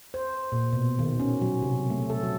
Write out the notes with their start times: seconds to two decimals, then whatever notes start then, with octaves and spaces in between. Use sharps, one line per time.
0.14 C5
0.52 A#2
0.73 B2
0.99 D#3
1.20 C#4
1.42 F#3
1.62 C3
1.90 A3
2.10 A4
2.23 F#3